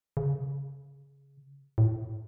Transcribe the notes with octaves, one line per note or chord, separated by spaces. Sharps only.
C#3
A2